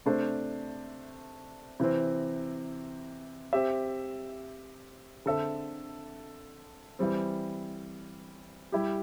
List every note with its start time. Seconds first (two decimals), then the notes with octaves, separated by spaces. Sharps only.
0.06 C3 A3 D4 C5
1.80 C3 E3 C4
3.53 C4 G4 E5
5.26 D3 C4 A4 E5
6.99 E3 G3 C4
8.72 G3 E4 G4